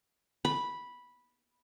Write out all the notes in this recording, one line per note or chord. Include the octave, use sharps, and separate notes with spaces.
B5